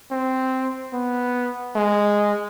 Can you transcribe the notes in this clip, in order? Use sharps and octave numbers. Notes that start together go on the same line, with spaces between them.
C4
B3
G#3